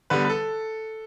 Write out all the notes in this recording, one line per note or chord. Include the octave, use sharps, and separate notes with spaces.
D3 G3 B3 B4
B4
A4